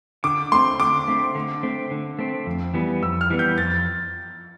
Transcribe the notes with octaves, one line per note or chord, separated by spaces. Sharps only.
D3 D6
A3 C4 C6
D3 D6
A3 C4
D3
A3 C4
D3
A3 C4
F2
E3 G3 B3
F2 E6
F6
E3 G3 B3
G6
F2 A6